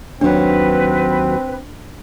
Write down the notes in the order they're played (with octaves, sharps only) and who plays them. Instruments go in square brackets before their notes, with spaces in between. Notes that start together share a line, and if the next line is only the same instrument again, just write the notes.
[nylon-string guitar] D#2 F#3 [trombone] C4 [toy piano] D4 [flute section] B4